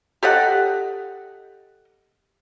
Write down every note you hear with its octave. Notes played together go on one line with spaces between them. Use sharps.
G4 A4 D#5 F#5